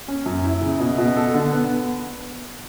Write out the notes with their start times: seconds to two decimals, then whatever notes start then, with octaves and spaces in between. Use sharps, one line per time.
0.08 C#4
0.26 F#2
0.44 E4
0.61 C#3
0.80 B2
0.98 B2
1.16 A4
1.34 D3
1.52 B3